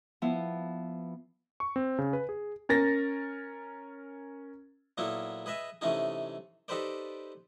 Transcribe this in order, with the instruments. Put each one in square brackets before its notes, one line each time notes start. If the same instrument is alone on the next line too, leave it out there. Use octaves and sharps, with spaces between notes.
[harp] F3 B3 E4
[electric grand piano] C#6
C4
C#3
B4
G#4
[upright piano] C#4 A#4 A6 A#6
[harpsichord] A#2 F#3 A#3 B3 E4 A4
G#4 B4 D#5 E5
C3 E3 A3 C#4 D#4 G#4
D#4 G4 A4 B4 C5 D5